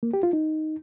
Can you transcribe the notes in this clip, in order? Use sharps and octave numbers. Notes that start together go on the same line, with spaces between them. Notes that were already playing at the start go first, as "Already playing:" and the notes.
A#3
G4
F4
D#4